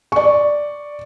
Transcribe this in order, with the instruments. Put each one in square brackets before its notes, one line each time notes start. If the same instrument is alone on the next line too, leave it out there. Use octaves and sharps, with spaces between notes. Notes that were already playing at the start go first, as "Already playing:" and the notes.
[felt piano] D5 C#6